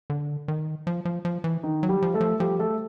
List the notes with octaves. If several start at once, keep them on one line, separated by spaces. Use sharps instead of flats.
D3
D#3
F3
F3
F3
E3
D#3 D#4
F#3
G3 G4
F3
A3 A4
F3
F3 G3 G4
A3 A4